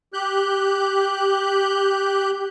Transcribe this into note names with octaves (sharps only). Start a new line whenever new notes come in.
G4 F#6 G6